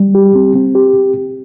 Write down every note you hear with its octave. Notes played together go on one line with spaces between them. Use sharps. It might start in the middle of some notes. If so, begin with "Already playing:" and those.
Already playing: G3
G4
C4
C4
G4